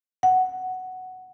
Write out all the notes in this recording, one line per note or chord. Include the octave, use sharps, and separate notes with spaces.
F#5